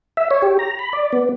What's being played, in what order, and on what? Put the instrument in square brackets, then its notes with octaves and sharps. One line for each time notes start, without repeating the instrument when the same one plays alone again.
[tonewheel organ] E5
C#5
G4
A#5
B5
D5
B3